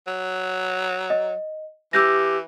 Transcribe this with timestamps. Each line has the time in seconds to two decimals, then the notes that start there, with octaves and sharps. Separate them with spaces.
0.07 F#3
1.10 D#5
1.93 E3 G4 E6 G6 A#6